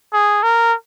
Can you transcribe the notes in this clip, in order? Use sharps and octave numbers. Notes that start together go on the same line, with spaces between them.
G#4
A#4